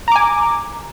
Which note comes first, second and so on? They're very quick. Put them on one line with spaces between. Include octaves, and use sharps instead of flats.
A#5 D6 G#5